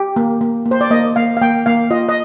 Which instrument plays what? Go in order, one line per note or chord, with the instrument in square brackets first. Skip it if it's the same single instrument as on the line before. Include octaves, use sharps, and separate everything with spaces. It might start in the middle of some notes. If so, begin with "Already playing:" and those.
Already playing: [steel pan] G4
A#3
A#3
A#3
C5
D5
A#3 D#5
A#3 F5
F5
A#3 G5
A#3 F5
F4 D#5
D#5